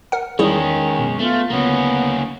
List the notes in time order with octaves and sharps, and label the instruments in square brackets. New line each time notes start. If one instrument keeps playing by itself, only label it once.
[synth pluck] A#4 F#5
[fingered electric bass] E2 [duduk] D#3 [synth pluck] G3 E4 G#4 [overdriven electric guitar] G#3 C#4
[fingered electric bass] F#1 B2
[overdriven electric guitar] A3 [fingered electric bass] B3 [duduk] F4
[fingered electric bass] D2 C#3 [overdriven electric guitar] A#3 C#4 [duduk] B3